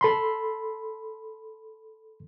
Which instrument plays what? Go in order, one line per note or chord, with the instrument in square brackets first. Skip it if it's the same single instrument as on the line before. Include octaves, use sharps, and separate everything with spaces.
[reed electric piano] A4 B5 C6